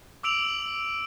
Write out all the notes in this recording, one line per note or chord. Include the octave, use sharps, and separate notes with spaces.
D6 E6 D7 F7 F#7